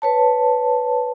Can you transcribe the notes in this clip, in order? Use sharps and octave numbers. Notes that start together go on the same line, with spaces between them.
B4 C#5 A5